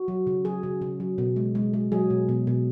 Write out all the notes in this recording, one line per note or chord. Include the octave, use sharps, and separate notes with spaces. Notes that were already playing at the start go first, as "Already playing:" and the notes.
Already playing: F#4
F#3
C#3
F#3 G#4
C#3
C#3
F#3
B2
G#3
G#3
G#3
F#3 G#4
B2
B2
B2